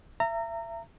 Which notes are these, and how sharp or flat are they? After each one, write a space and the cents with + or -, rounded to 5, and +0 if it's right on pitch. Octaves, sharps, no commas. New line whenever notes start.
E5 +30 A#5 -25